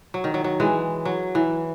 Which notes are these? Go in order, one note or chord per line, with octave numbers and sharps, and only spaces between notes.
F#3
D#3
F#3
F#3
E3 G#3
F#3
E3